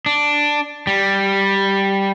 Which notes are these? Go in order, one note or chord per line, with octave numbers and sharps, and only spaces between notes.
D4
G3